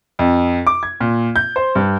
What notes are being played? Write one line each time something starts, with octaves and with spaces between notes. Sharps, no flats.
F2
D6
G#6
A#2
G6
C5
G2